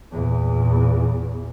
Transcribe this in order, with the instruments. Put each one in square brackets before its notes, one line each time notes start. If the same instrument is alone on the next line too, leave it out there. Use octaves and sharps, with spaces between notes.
[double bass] E2 A#2